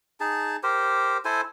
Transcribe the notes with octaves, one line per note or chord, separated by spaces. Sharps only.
D#4 G#4 A5
G4 A#4 C5
E4 A4 C5 G#5